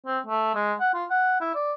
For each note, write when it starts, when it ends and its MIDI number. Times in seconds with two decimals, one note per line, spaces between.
0.06 0.19 60
0.27 0.55 57
0.55 0.73 56
0.80 0.90 78
0.94 1.04 65
1.10 1.38 78
1.40 1.51 64
1.55 1.73 74